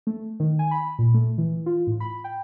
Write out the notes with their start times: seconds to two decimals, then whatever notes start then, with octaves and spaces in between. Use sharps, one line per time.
0.07 A3
0.40 D#3
0.59 G#5
0.71 B5
0.99 A#2
1.14 A3
1.38 E3
1.66 F4
1.87 A2
2.00 B5
2.24 G5